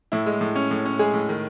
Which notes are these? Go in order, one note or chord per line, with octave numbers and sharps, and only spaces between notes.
A2 E4
G#3
A2
C#4
A2
C#4
G#3 G#4
A2
D#3